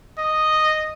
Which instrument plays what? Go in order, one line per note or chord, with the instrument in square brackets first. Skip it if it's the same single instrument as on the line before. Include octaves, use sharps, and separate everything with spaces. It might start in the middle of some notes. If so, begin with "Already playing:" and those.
[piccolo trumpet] D#5